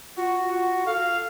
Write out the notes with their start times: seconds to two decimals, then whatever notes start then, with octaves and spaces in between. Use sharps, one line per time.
0.17 F4 F#4
0.51 F#4
0.86 A4 F5